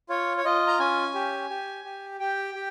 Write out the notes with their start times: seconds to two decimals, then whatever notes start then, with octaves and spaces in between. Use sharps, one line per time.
0.09 F4 C#5
0.37 C#5
0.45 F4 D#5
0.67 A#5
0.80 C#4 G#5
1.14 G4
1.50 G4
1.85 G4
2.19 G4 G5
2.54 G4